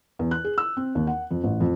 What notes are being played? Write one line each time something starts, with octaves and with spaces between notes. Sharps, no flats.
E2
F#6
G#4
E6
C4
D#2
F#5
F2
A1
F2